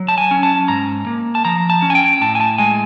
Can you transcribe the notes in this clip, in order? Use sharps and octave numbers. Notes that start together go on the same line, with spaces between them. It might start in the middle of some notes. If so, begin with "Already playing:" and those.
Already playing: F#3
A5
G#5
C#4
A5
G#2 A#5
A#3
A5
F3 A#5
A5
C#4
G#5
G5
A2 A5
G#5
A5
G#3 G#5